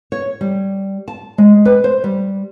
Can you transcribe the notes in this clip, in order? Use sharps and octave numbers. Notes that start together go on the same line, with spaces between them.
C#5
G3
A5
G#3
B4
C5
G3